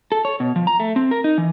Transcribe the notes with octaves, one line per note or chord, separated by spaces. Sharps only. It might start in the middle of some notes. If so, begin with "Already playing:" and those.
A4
C#5
B2
F3
A#5
A3
C4
A#4
D#4
E3